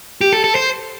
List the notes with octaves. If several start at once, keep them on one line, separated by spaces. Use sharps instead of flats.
G4
A4
A4
C5